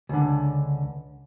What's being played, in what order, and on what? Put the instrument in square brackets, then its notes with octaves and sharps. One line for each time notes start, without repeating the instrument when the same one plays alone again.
[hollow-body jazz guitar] C#2 D3